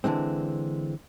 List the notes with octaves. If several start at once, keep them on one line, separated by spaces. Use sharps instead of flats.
D3 E3 G#3 C4